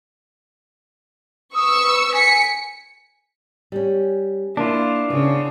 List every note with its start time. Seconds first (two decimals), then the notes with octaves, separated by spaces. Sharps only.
1.54 B4 C#6 D#6 E6
2.13 G#5 B6 C#7
3.72 G3 C#4
4.57 A#3 D4 E4 F4
5.10 C#3 B3